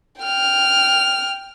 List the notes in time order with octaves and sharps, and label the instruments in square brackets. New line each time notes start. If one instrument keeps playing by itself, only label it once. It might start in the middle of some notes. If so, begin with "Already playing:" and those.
[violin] G5 F6